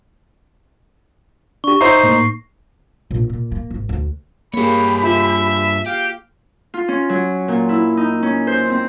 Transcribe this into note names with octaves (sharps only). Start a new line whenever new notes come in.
D4 G4 C#6
D#4 C5 E5 A#6 C7
A2 A#3
A#1
A#2
A#3
G#1
D2
G2 A#3 G4 G#4 C#5 B5
F4 E5
G4 F5 G6
F4
C#4
F#3
A#2
E4
D#4
C#4
C5
C4